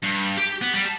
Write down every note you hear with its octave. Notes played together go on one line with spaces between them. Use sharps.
G2
G4
B3
G3
A5